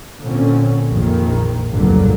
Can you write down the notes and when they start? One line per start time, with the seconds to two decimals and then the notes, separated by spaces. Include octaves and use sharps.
0.21 A#2 D3 C4 C#4
0.87 A#1 F2 D#3
1.68 F1 C#2 G2 A#2 D3 F#3